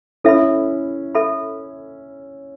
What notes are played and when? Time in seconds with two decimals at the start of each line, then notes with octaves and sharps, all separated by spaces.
0.24 C#4 E4 A4 E5 B5
1.15 A4 E5 B5